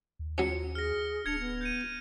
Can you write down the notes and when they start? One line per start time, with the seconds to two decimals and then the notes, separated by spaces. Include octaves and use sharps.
0.19 D#2
0.38 F#3 C#4 F4 C#7
0.75 G#4 F6 A#6
1.26 D1 D4 G#6 C#7 F7
1.39 B3
1.61 G6 C#7 D#7